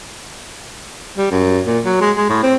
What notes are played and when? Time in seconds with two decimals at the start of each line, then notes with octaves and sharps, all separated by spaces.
1.17 G3
1.31 F#2
1.65 A#2
1.85 F#3
2.01 G#3
2.17 G#3
2.29 A2
2.43 C4